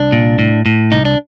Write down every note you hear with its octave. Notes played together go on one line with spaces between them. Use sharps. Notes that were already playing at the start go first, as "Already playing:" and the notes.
Already playing: C2 D4
A#2
A2
A2
C2 D#4
D4